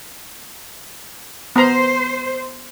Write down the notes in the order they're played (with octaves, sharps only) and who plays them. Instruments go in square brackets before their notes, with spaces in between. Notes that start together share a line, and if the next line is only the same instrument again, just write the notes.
[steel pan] B3 A#5 [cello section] C5